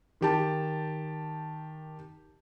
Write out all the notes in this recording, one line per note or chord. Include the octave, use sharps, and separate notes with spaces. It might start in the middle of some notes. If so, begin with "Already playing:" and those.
D#3 G4 A5